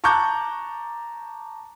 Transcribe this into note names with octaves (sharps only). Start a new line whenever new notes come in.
A5 A#5 C#6 D6 F#6 G6